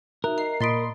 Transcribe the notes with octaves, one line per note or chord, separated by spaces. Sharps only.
D#4 F#4 A#4 E5 F#6
D#5 A#5 C7
A#2 D#5 B5 C6 D#6 A6 B6 D7